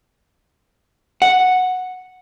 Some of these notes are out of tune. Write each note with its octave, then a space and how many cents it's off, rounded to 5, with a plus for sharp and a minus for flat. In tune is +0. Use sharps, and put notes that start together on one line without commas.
F#5 -5